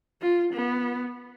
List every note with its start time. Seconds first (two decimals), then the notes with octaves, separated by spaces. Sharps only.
0.22 F4
0.54 B3